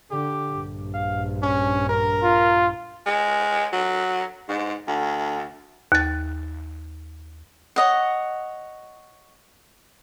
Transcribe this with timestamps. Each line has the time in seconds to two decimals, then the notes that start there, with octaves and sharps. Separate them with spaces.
0.11 D3 G4
0.51 A#1 G2
0.94 F5
1.43 C#4
1.89 A#4
2.23 F4
3.06 G#3
3.73 F#3
4.49 G#2
4.88 D2
5.92 D#2 A6
7.76 C#5 D#5 F#5